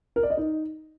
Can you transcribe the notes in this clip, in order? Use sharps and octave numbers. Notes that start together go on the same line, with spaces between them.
A#4
D5
D#5
D#4